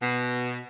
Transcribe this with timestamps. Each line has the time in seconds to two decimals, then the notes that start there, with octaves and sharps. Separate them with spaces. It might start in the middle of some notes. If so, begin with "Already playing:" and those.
0.02 B2